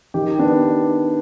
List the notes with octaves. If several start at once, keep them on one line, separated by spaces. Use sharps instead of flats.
D#3 G4
B3 D4